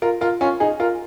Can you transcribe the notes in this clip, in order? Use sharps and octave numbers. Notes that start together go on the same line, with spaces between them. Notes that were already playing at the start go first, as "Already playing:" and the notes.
F4 A#4
F4 A#4
C#4 F4
D#4 G#4
F4 A#4